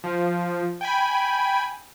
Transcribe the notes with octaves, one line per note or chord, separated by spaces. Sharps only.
F3
G5 G#5 B5